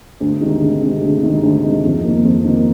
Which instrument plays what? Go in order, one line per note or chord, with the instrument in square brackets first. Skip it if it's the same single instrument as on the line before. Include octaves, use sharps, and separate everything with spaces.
[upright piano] D2
C3 D#3 G#3 D#4
D2
C3 D#3 G#3 D#4
D2
C3 D#3 G#3 D#4
D2
C3 D#3 G#3 D#4
F2
A#3
D#3
F2
D#3 A#3